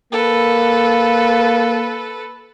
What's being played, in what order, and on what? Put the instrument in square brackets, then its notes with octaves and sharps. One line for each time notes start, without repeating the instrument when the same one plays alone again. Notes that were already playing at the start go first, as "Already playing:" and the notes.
[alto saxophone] A#3 [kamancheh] A4 B4